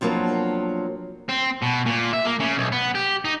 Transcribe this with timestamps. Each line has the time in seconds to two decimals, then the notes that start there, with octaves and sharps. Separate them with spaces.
0.01 C3 F3 F#3 A#3 B3 D4
1.29 C4
1.63 B2
1.87 A#2
2.14 E5
2.25 A#3
2.40 C#3
2.58 B1
2.72 B3
2.95 G4
3.25 D#4